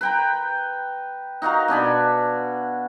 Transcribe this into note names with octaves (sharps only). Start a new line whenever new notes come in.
B4 G5 A#5
D#4 F#4 F5 A#5
B2 D4 G#5 B5